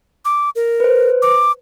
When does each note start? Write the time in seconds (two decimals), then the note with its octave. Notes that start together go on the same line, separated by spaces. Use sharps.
0.25 D6
0.56 A#4
0.80 B4 C5
1.22 D6